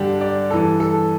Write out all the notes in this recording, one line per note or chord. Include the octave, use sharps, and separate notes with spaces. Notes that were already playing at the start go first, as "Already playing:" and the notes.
Already playing: G2 D3 D4 G4
D5
G2 E3 A4
A4